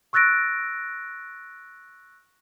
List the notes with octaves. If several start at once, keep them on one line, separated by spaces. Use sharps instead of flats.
C#6 E6 F#6 A6 A#6 D7